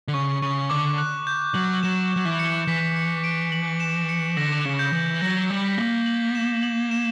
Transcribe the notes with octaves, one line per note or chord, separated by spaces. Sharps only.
D3
C#3 C#6
C#3 C#6
D3 D6
F#6
G6
F#3 F#7
F#3 E7
F#3
E3
C#7
E3 B6
C#7
D7
F#7
E7
C#7
D3 A#6
C#3
G6
E3
F#3 A#6
G3
B6
A#3
F#7
E7
F#7
E7